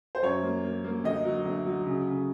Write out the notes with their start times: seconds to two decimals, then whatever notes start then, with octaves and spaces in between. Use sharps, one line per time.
0.15 C5
0.23 F#2 C#5
0.43 A#3
0.64 A#3
0.84 A#3
1.04 D2 D#5
1.25 F#3
1.45 D2
1.66 F#3
1.86 C#3
2.07 C#3